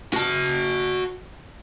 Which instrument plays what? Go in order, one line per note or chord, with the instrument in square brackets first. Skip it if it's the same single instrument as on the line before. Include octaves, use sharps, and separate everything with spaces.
[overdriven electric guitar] F#4 A5